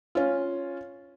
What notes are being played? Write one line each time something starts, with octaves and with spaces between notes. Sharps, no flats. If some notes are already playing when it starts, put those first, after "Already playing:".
C#4 F4